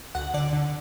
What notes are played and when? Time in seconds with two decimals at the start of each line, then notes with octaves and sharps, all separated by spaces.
0.15 D2 F#5
0.34 D3 D5
0.53 D3